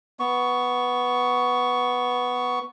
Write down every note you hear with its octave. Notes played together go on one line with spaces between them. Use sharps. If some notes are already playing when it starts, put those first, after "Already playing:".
B3 C#6